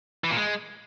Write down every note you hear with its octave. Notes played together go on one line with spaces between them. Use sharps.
E3
A#2
G#3